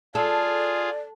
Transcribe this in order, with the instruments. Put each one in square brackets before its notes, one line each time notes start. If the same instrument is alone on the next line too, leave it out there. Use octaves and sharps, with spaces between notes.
[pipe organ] F4 G#4 [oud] A4 [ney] D5